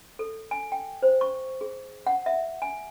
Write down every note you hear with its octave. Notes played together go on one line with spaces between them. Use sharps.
A4
G#5
G5
C5
C#6
G#4
F#5
E5
G#5